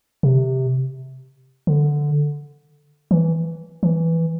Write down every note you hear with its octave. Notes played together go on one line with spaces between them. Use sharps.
C3
D3
E3
E3